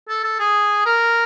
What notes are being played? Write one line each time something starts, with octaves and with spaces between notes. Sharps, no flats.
A4
A4
G#4
A#4